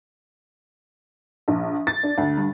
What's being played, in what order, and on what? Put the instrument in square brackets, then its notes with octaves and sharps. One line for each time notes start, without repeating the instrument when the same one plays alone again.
[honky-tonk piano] A#1
A6
D4
D2
G2